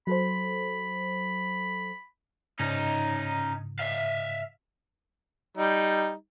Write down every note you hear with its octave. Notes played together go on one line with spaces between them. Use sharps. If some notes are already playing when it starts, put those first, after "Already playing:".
F#3 A4 C5 B5
G#2 C#3 C#4 D#4
E5 F5
G3 D#4